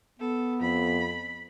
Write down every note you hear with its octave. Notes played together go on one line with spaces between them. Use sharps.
B3 A4
F2 B5